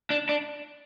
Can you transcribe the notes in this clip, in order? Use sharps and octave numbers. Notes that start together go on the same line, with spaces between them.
D4
D4